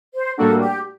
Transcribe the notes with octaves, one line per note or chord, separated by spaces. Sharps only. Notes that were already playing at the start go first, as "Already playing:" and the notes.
C5
A2 G3 A#3 D4 F#4 A4
G4